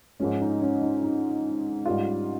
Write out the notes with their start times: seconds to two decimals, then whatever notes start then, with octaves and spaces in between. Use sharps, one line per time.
0.20 G#2 F3 G#3 C#4
0.41 D#4
0.62 C#4
0.82 D#4
1.03 D#4
1.86 G#2 G3 C#4 F4